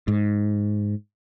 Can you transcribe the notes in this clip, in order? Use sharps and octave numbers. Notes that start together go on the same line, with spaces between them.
G#2